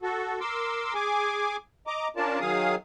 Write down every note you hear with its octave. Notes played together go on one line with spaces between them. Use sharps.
F#4 A4
A#4 C6 D6 E6
G#4 G#5 D6
D#5 A#5 D6
C#4 D4 F4 A#4 D5 A5
D#3 F#3 G#4 F5 D#6